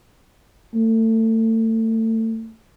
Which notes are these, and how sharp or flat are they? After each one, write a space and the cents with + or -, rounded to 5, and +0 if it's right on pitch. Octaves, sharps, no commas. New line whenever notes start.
A3 +30